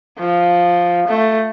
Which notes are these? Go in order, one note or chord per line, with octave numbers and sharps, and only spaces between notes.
F3
A3